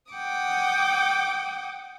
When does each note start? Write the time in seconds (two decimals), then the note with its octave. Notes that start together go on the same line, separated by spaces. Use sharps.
0.13 F#5 G5 D6 D#6